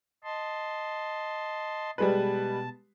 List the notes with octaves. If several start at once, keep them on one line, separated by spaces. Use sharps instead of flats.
D#5 A5 C6
B2 G3 G#3 B4 A5